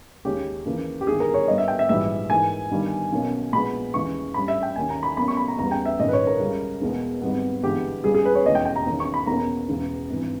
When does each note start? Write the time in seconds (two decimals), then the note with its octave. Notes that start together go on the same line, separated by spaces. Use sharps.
0.25 D#2 C#3 G#3 C#4 G4
0.65 D#2 C#3 E3 A#3
1.01 G4
1.07 G1 G2 D#3 G#4
1.20 A#4
1.34 C#5
1.48 G2 G3 B3 D#5
1.58 E5
1.68 G5
1.79 E5
1.89 A#1 G#2 E3 G3 E5
2.30 G#2 E3 A#3 G#5
2.71 G1 G2 D#3 G3
3.12 B1 B2 A#3 C#4
3.53 A#1 A#2 G#3 B3 B5
3.94 D#2 C#3 E3 G#3 C#6
4.34 G2 G3 C#4 B5
4.48 E5
4.63 G5
4.76 D#2 D#3 A#3 C#4 G#5
4.90 A#5
5.03 B5
5.17 B1 B2 A#3 C#4 B5
5.28 C#6
5.37 B5
5.48 A#5
5.59 E2 C#3 G3 B3 A#5
5.71 G5
5.85 E5
5.99 A#1 G#2 D#3 A#3 C#4 D#5
6.08 B4
6.13 C#5
6.27 A#4
6.40 C#2 C#3 G3
6.82 E2 B2 G#3 B3
7.22 G#1 G#2 G3 B3
7.63 G1 G2 E3 G#3 B3 G4
8.04 C#2 C#3 G3 G#4
8.14 G#4
8.25 B4
8.35 C#5
8.45 E1 D#2 C#3 E3 G#3 D#5
8.55 G5
8.65 G5
8.76 A#5
8.87 E2 D#3 A#3 C#4
9.00 C#6
9.14 B5
9.27 E2 B2 A#3 C#4 A#5
9.68 E1 E2 C#3
10.10 G#1 G2 E3